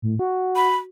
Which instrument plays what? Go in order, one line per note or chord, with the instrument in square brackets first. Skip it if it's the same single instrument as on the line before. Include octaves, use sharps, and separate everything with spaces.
[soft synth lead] A2
F#4
[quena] B5